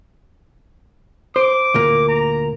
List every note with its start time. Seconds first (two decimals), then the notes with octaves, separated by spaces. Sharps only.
1.36 C5 D6
1.74 D2 A#2 A#3
2.08 A#5